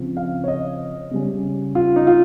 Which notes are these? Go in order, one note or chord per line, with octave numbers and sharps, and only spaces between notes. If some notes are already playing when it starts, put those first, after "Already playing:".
Already playing: C#3 F3 C4
F5
C#5
D#5
C#3 G3 C#4
F4
D#4
F4